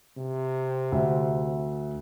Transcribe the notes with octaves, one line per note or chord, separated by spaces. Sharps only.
C3
D2 E5